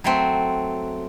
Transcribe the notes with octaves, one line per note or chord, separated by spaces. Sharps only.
F#3 A3 C4